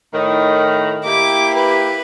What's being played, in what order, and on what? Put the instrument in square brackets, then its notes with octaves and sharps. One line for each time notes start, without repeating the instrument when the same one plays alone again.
[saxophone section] A2 D#3
[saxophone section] A#3 E4 G4 [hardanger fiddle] D6
[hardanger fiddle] B4